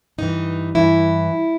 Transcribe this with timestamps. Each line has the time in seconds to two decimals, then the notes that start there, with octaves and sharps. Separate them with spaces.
0.18 G2 E3 D#4
0.75 G2 E3 E4